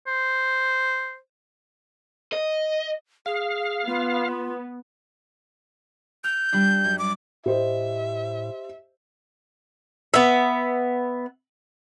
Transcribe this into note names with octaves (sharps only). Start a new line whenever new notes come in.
C5
D#5
G#4 F5
B3 F4
F6 G6
G3 D4
F#2
D6
A2 G4 C5 D#5 E5
B3 E5